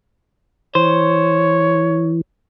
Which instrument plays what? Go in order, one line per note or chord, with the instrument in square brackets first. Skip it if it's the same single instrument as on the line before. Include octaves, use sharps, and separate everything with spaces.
[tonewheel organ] E3 [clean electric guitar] C5 [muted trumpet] C#5